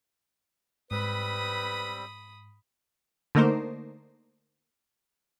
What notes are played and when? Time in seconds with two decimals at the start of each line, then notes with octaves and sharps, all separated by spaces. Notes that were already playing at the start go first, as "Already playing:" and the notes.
0.91 G#2 G3 C4 B4 B5 D#6
3.35 D3 A3 A#3 D#4 A#4 C5